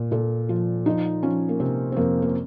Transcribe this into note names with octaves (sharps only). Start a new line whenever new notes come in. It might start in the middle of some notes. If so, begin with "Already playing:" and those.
Already playing: A#2
A#2 A4
F3
F3 D#4
F3 C#4
A#3
C3 C4
C4
F2 A#3
A#3